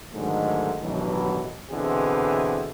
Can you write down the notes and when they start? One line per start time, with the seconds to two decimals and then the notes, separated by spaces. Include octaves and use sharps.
0.14 G#2 D3 D#3 F#3 A3
0.82 A1 G2 B2 D#3 E3 F#3
1.71 B2 D3 E3 C4 G#4 C5